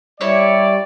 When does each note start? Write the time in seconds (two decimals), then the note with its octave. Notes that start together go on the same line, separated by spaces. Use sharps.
0.21 G3 E4 C#5 D5